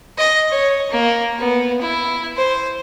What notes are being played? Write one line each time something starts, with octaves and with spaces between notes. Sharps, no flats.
D#5
C#5
A#3
B3
E4
C5